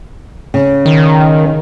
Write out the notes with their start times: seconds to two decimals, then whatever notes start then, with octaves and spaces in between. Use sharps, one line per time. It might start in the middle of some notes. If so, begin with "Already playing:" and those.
0.54 C#3
0.86 D#3